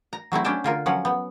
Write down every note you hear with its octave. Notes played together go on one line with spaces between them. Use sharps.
A#5
F#3 A3 C4 E4
C#4 D4 E4 G5 A5
D3 F4 A#4
F3 F#3 C#4 F#5
B3